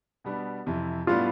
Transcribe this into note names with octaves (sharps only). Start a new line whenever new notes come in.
B2 G3 B3 D4
F2 C3 E3
A2 G3 B3 D4 F4